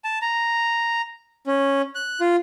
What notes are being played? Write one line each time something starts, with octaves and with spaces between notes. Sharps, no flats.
A5
A#5
C#4
F#6
F4